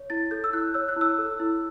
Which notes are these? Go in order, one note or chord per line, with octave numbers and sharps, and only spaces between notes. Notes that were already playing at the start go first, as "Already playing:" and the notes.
Already playing: C#5
E4 A6
A4 G6
E6
E4 F#6
C#5 E6
F#6
E4 E6
A4
E4